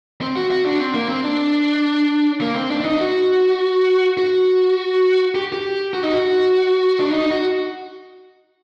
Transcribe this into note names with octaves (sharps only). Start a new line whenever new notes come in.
C4
F#4
F#4
D4
C4
A#3
C4
D4
A#3
C4
D4
D4
D#4
F#4
F#4
G4
G4
F#4
D#4
F#4
D4
D#4
F#4